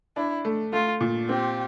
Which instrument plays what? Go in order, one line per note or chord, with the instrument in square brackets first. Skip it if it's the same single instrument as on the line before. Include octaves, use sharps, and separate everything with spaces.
[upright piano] D4 [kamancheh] E4
[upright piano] A3
[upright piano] A3 [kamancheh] F4
[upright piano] A#2
[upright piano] C4 [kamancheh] G4